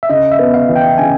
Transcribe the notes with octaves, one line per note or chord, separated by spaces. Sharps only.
E5
C#3 D#5
E5
B3
F5
E3
G5
C#3 G#5